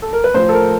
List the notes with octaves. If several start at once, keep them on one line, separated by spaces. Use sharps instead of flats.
A4
A#4
B4
A2 F3 C5
A4
A#4